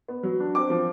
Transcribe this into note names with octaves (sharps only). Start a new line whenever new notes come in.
B3
F#3
D4
C4 D6
F3